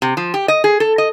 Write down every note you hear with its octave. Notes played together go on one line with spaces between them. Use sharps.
C3
F3
G4
D#5
G#4
A4
D#5